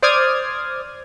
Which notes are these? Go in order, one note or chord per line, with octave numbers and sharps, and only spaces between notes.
C5 D5 D6 D#6 F6 G#6